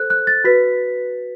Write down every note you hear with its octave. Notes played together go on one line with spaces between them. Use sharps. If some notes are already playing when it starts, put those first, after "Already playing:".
Already playing: A4 C5 F#6
F#6
A6
F#4 B4 B6